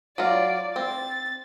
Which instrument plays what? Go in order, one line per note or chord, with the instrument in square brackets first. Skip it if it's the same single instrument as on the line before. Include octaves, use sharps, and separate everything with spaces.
[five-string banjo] F#3 F4 [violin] D5
[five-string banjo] C4 [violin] A6